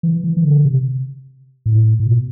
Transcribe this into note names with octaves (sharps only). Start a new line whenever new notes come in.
E3
E3
E3
D3
C3
A2
A2
B2